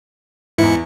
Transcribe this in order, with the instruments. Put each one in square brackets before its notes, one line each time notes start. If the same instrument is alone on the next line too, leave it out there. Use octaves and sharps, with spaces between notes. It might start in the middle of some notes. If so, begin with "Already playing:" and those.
[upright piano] E2 E3 [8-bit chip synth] G#2 E4 C#7